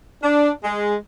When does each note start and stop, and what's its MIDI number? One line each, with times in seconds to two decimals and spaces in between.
0.22 0.51 62
0.64 0.94 56